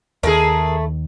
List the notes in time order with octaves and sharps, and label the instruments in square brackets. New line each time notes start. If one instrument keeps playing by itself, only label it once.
[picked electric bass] D#2 D#3 [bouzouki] A3 E4 [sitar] G#4 A#4